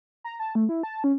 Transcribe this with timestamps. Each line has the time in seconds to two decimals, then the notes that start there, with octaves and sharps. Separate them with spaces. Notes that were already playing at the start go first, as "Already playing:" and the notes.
0.24 A#5
0.40 A5
0.55 A3
0.69 E4
0.83 A5
1.04 C#4